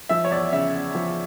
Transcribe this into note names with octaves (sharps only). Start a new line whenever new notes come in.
F3 E5
C#5
E2 D5
C#3 E5
E2
F3